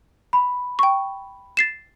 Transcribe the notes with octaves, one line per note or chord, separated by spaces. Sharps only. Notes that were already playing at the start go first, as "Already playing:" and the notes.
B5
G5 C#6
A6 C7 E7